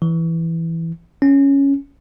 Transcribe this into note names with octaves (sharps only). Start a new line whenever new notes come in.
E3
C#4